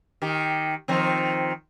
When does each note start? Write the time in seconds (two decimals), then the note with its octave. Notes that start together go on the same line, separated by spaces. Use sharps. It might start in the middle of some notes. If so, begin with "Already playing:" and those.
0.22 D#3 G4
0.88 D#3 F3 C4